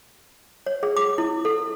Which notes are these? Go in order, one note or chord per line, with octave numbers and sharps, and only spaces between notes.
C#5
G#4
D6
E4
A4